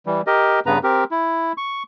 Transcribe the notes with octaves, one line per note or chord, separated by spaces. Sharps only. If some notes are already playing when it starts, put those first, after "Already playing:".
E3 G3
G4 A#4 D#5
G2 C#3 B3 B4 A#5
C4 G4 A#4
E4
C#6